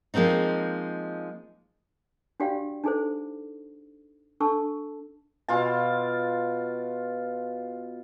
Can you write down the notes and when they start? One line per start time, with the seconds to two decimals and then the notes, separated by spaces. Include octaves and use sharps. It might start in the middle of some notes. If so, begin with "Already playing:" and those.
0.14 F3 G#3 A#3 C4 D#4
2.40 D4 F#4 G4 D5 F5 G5
2.84 D4 D#4 G#4 A4 C5
4.40 D4 A4 A5 C#6 E6
5.48 B2 F4 A5